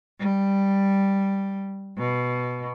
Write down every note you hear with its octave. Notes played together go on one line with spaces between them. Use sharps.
G3
B2